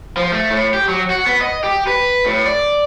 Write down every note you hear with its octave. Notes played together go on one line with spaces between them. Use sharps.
F3
A3
A2
G4
F#3
F#4
B3
D#5
G4
B4
A2
D5